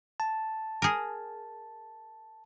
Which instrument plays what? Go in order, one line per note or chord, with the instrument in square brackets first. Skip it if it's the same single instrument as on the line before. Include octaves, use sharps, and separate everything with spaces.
[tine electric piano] A5
[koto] G#4 A#4